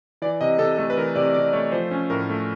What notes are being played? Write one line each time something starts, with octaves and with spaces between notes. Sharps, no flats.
E3 D5
C3 D#5
C3 A4
A3 A4
B4
E3 A#4
C3 D5
C3 D5
A3 C#5
F3 C5
C#4
A2 A#4
A3